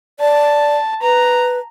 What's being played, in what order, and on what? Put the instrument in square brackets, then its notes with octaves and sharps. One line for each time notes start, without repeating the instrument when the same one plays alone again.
[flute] D5 [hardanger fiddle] A5
[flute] B4 [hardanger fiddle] A#5